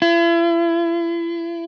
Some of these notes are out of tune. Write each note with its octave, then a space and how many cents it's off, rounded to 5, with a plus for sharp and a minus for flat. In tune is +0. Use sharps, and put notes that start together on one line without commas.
E4 +40